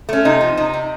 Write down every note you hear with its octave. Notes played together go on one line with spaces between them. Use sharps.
A3 C#4
C3 D#4
F3
C3 D#4
C3